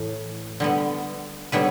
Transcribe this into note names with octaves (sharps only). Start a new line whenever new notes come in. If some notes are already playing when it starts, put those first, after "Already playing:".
Already playing: A2 E3 A3
D3 G3 B3
D3 G3 B3 B4 C#5